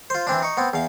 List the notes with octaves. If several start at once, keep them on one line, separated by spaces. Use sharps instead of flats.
F4 C5
E3 C4 D4
D#4 C#6
B3 C4
E2 F5